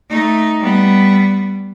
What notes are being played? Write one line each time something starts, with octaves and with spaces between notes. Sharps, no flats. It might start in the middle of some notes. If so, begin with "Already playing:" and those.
A3 D#4
G3 B3